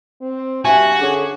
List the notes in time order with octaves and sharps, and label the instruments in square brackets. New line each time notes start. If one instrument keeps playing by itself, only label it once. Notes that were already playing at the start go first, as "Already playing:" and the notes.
[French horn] C4
[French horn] G2 [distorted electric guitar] F#4 [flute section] E5 F#5 [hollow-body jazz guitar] G#5
[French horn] D3 [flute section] C#4 G#4 D6